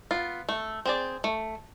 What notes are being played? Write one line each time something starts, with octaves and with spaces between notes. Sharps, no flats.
B3 F4
A3
C4 G#4 D5
A3